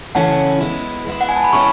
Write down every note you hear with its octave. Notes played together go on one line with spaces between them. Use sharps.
C#3 E3 A3 C#4 E4 F#5 A5
G#3 B3 E4
G#3 B3 E4
F#5
G#5
A5
B5
G#3 C#4 E4 A5 C#6